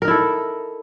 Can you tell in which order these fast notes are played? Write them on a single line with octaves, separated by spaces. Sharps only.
A#4 D#4 E4 A4